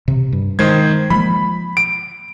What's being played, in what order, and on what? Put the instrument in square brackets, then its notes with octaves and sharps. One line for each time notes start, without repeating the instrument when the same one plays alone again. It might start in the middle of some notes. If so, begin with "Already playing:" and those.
[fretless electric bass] C3
G2
[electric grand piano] D#3 C5 G#6 [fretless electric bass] G#3
[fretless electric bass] F3 G#3 A#3 [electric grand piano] B5
[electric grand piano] D7